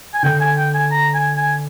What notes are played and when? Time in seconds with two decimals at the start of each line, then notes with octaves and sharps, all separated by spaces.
0.14 G#5
0.23 D3 G5
0.40 G#5
0.57 G5
0.74 G#5
0.91 A#5
1.14 G#5
1.37 G#5